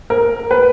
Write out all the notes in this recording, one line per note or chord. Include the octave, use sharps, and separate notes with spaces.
A#4
B4